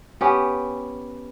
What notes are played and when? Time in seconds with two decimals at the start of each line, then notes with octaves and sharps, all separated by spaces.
0.21 B3 C#4 G4